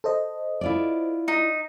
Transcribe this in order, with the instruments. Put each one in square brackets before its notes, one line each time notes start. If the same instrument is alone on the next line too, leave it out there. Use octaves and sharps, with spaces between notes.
[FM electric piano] A4 C5 D#5
[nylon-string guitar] E4 F4 D5
[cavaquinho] D#4